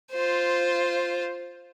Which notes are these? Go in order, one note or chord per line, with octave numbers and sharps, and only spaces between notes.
F4 C5